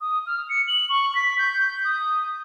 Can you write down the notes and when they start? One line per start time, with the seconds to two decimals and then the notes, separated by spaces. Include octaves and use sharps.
0.01 D#6
0.27 F6
0.50 C#7
0.68 F#7
0.89 C#6
1.15 B6
1.39 G6
1.85 D#6